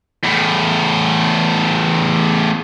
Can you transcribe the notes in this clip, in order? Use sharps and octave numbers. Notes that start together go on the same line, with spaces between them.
E2 A2